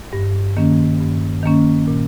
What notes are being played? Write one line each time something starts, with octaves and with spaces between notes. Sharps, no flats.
G2
D#3 A#3 C#4
G2
D#3 A#3 C#4
A#2